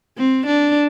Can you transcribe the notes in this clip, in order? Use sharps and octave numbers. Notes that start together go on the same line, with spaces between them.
C4
D4